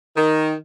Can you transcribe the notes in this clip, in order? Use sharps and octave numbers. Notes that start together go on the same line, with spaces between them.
D#3